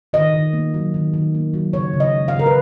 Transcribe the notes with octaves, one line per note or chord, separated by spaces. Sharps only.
D#3 D#5
D#3
A#3
F#3
D#3
D#3
A#3
F#3
C#3 C#5
C#3
D#5
G#3
F5
C#3
A#4
B4